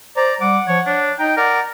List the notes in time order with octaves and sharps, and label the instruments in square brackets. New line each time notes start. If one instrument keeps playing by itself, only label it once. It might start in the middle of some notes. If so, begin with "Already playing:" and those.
[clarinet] C5 [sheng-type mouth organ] D5 A#5
[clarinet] G3 [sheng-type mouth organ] F#5 [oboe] D6
[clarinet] F3 [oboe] C#5
[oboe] D4 [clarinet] C#5
[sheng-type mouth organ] D#4 [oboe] G5 [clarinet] A#5
[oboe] A#4 [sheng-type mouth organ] D5 [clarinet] F#5